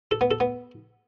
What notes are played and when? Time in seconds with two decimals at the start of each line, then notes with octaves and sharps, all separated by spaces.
0.11 A4
0.21 B3
0.31 A4
0.40 B3